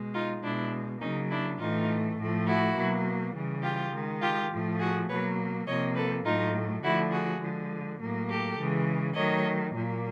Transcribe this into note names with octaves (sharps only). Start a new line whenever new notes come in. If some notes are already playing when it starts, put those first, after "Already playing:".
Already playing: B2 G#3
D#4 F4
B2 G#3 D4 E4
C#3 F#3 A#3 C#4 D#4
D4 E4
A2 E3 A3 D#4 F4
A2 F3 A3
E4 F#4
B2 F#3 A#3
C#3 E3 G3
F4 G4
D#3 G#3
F4 G4
A2 F3 A3
F#4 G#4
B2 F#3 A#3 B4 C#5
C3 F3 A#3 C#5 D#5
A4 B4
A2 F#3 A3 D#4 F4
D3 F3 A3 E4 F#4
F#4 G#4
D3 F3 G#3
A2 F#3 A#3
G4 A4
C#3 E3 G#3
D#3 F#3 A3 C#5 D#5
A#2 F#3 A#3